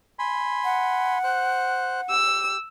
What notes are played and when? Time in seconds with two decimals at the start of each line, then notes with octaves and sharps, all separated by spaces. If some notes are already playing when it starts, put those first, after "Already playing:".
0.19 G#5 B5 C6
0.64 F#5
1.24 C5 F#6
2.09 G4 E6